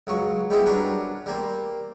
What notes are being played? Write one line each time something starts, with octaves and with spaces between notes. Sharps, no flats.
C#2 F#3 C#6
G3 G#3 B3 C4 E4 G4
F#3 G3 C#4 D4 A#4 B4
G3 A#3 C4